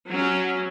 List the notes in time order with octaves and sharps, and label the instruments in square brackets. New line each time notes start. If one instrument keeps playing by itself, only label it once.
[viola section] F#3 C#4